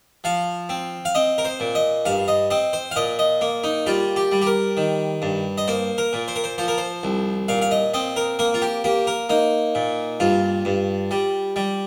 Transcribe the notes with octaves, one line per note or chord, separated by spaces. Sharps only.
F3 F5
C4
F5
C4 D#5
A#4
C5
A#2
D#5
G2 F5
D#5
C4 D#5
C5
F5
A#2 D#5
D#5
A#3
D#4
G3 F4
G4
G3
G4
A#4
D#3
G2
D#5
A#3 C5
A#4
A#2
C5
A#4
C5
F3 C5
A#4
C5
C2
A#2 F5
F5
D#5
C4 D#5
A#4
A#3 A#4
F4
G4
A#3 G4
A#4
A#3 D#4
A#2
G2 F4
G2
G3
G3